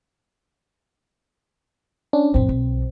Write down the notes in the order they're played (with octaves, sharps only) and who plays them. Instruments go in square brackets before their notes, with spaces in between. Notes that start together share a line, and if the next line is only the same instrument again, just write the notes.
[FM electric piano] C#4 D4
[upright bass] F2 A2 [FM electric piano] C4
[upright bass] B1